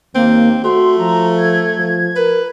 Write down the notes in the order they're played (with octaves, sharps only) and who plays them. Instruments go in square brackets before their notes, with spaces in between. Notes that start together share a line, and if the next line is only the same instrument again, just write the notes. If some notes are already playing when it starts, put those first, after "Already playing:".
[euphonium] D#2 [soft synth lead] A#3 [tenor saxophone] C4
[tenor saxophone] A3 [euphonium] F#4 [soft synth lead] C6
[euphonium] F3 [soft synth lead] A#5
[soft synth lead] G#6
[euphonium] F3
[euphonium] A#4 [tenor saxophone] B4